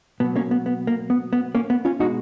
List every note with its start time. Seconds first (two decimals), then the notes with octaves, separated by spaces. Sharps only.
0.20 B2 F#3 B3
0.36 A#3 C#4
0.51 B3
0.66 B3
0.87 A#3
1.10 B3
1.33 B3
1.55 A#3 C#4
1.70 B3
1.85 C#4 F4
1.99 B2 G#3 D#4 F#4